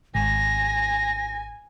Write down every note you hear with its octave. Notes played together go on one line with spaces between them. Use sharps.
G#1 G#5 A#6